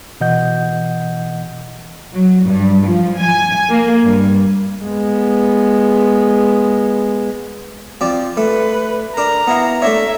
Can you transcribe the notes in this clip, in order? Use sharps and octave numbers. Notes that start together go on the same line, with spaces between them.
B2 E3 D#5 F#5 G6
F#3
G2
F3
G#5
A#3
G2
G#3 B3
F3 C4 D5
A3 B4
D4 A#4 A#5
B3 E4 F5
A3 D4 C#5 E5